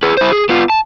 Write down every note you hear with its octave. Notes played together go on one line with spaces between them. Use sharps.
G#4 B4
E4 C5
G#4
B3 F4
A5